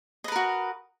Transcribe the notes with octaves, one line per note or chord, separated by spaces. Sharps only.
F#4 A#4 B4 D#5